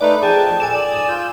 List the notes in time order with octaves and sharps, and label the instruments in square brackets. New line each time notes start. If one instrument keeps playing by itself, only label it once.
[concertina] A3 D#4 B4 [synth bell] D5
[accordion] F2 G5 [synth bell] G#4 [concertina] A5
[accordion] A#2 A4 D6 [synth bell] G#5 E7
[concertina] D5
[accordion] G#2 D#6
F4 E6 G6